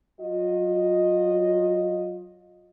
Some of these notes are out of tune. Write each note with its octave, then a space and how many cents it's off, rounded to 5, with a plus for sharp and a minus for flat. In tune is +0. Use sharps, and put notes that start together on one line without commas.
F#3 +0 F4 +35 D#5 +0